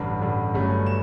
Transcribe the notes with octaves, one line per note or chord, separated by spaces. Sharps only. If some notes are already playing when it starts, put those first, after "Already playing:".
Already playing: A1 G2 D3
A1 G2 D3
G1 G2 F#3 A3 C#4
E7